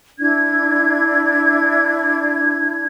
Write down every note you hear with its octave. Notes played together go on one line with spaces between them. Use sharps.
D4 E4 G#6